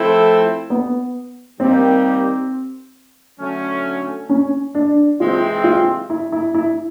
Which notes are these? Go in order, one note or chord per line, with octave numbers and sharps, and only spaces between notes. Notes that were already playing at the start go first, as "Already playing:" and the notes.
Already playing: F3 A3 C4 E4 A4
B3
D#3 G3 A#3 C4 D#4 G4
D3 F#3 A3 C#4
C#4
D4
C3 E3 G#3 C4 F4
F4
E4
E4
E4